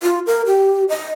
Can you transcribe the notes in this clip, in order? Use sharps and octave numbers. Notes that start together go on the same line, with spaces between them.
F4
A#4
G4
D#5